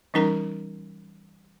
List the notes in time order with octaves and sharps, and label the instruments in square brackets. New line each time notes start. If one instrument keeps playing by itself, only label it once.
[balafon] E3 G3 C#4 D#4 A#4 A#5